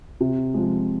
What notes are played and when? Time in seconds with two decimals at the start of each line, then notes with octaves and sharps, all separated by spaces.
0.20 C3
0.54 F3 G#3